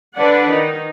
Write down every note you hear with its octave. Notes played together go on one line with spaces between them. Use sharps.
D3 D4 B4 D5 F#5
D#3 D#4